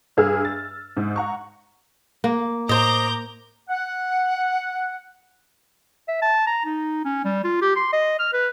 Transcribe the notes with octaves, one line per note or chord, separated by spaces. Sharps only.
G2 G#4 E6 F6
A6
G#2
F#5 A#5 C#6
A#3
A2 C5 D#5 A#5 D6 G6
F#5
E5
A5
A#5
D#4
C#4
G3
F4
G4
C6
D#5
F6
B4